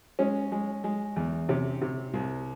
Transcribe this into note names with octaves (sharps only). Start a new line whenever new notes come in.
G#3 C#4
G#3
G#3
E2
C3 C#4
C3
C2